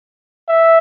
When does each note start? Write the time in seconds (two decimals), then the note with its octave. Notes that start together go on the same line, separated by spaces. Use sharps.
0.48 E5